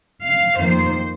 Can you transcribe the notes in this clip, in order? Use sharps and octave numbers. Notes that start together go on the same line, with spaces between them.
F5
F2 D#3 A#3 C5